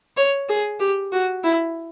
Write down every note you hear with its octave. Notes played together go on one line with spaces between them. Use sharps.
C#5
G#4
G4
F#4
E4